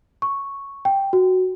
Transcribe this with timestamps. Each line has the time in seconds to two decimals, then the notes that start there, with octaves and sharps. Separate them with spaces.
0.22 C#6
0.85 G5
1.13 F#4